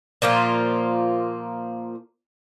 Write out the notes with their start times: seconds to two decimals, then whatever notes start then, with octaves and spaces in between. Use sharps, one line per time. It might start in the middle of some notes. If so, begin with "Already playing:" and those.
0.22 A#2 F3 A#3 F4